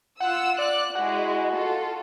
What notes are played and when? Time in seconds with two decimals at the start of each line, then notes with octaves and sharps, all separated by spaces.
0.20 F4 F#5 E6
0.58 D5 F#6
0.95 G#3 E4 F#4
1.52 F4 A4